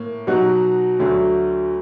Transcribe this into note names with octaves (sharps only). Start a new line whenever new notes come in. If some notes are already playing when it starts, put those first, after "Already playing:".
Already playing: A2 A#3
B2 F#3 B3 D#4 F#4
D2 D3 F#3 A3